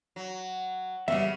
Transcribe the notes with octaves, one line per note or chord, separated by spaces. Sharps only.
F#3
C#3 G3 B3 E5